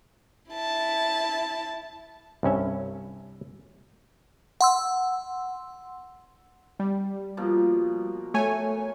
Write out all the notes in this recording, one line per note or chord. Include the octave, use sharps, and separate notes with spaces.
E4 A5
C2 G2 C#4 E5
F#5 C6 E6
G3
B2 F3 A#3
A3 C#5 G#5